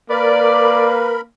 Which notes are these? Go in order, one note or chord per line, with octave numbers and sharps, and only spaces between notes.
A#3 A#4 B4 D5 B5